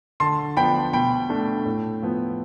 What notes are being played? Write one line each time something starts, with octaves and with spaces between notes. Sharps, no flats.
D3 A5 C6
F3 B3 D4 G5 B5
B2 G5 B5
A3 D4
A2
F3 B3